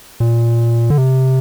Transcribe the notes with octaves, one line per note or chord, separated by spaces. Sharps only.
A#2
D3
C3